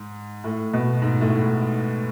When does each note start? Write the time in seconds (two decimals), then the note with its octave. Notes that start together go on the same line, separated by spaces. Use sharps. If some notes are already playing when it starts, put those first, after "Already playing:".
Already playing: G#2
0.44 A2
0.73 B2
1.02 G#2
1.21 A2
1.41 G#2